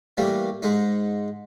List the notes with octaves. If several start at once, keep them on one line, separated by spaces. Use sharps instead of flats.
E3 G3 A3 A#3
G#2 G#3 D#4